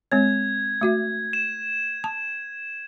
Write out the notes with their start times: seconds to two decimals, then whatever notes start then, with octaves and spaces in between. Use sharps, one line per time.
0.12 G#3 C4 C#5 G#6
0.81 A3 F#4 E5
1.33 E7
2.04 A5